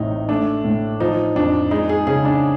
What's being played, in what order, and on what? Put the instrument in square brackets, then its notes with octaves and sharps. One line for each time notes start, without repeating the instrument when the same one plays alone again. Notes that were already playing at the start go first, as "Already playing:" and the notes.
Already playing: [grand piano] A1 A2 C3 D#4
A3 D4
A2
F3 D#4
F2 D4
G#3 D#4
G#4
C#3 G#4
D4